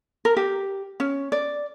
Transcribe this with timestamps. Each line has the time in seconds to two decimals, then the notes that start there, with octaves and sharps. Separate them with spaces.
0.25 A#4
0.37 G4
1.00 C#4
1.32 D5